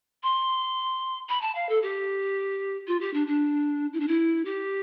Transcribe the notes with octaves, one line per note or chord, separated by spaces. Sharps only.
C6
B5
A5
F5
A4
G4
F4
G4
D4
D4
E4
D4
E4
G4